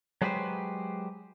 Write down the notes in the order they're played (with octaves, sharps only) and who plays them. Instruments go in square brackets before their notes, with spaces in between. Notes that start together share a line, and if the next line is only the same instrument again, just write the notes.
[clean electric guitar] F#3 G#3 F#4 G4 B4 C5